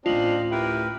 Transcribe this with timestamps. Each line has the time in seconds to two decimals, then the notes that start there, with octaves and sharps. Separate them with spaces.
0.06 A1 D2 C4 D4 F4 D#5 F5 F#7
0.52 E4 G4 A#4 B4